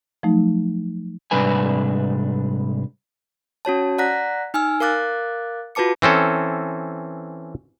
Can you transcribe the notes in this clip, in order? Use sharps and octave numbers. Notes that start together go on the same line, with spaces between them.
F3 F#3 A3 D#4
G#2 C3 G3 D4 B4 G#5
C#4 F#4 C#5 A5
D5 F#5 A#5 F#6 A#6 B6
D#4 G#5 E6 F6
A#4 F5 D6 F#6 A6
F4 F#4 B4 A5 D6 C#7
E3 C4 C#4 A4